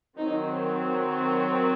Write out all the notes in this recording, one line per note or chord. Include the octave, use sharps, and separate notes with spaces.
D#3 F#3 C4 D#4